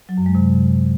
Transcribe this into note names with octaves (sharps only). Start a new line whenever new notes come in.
F#3
F#2
G#3
C3